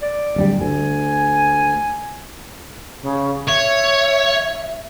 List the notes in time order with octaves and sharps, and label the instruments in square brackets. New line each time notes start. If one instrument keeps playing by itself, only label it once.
[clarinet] D5
[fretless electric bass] D1 G2 G3
[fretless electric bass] D2 [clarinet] G#5
[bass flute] C#3
[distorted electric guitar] C#5 [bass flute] E5